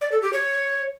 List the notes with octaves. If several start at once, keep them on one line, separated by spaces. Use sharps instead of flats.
D5
A4
G4
C#5